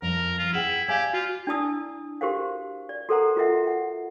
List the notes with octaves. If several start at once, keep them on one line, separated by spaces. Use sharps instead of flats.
F2 F3 A#4
F4
E4 G#4 F#5 G5
G4 D5 F5 G#5 G#6
F4 F#4
D4 E4 D5 A5 D#6 E6
F#4 G4 A#4 C5 F5
D5
F#4 A4 A#4 C5 F#5 A#5
F4 F#4 A#4 D#5 E5 F#5
F#5